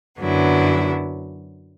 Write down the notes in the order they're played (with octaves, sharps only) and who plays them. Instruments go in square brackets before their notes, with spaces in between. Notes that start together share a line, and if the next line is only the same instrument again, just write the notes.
[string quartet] F#2 D3 F#3 B3 E4